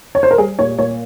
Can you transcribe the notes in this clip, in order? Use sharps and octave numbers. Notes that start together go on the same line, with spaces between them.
C#5
C5
A#4
G3 G#4
A#2 C#5
A#2 C#5